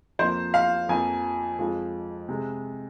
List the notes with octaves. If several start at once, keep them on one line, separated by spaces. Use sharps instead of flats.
F2 F3 A#3 C5
F5
F2 F3 A#3 G#5
F2 F3 G#3
C3 G#3